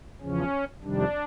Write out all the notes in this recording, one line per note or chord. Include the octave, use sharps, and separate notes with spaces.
E2 C#3 F3 C#4
F2 C3 D#3 G3 D4